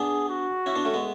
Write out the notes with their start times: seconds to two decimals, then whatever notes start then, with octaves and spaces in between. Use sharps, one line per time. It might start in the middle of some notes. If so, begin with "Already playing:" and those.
Already playing: B3 D4 G#4
0.29 F#4
0.66 C#4 E4
0.75 B3 D4
0.85 A3 C#4
0.94 G#3 B3